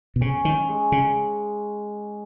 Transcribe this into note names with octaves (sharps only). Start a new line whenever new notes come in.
B2
C#3 C#4
D#3
G#3
C#3